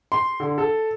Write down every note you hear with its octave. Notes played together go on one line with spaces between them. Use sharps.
C6
D3
A4